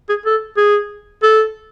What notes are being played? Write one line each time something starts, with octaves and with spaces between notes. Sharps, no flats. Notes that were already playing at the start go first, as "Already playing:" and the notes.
G#4
A4
G#4
A4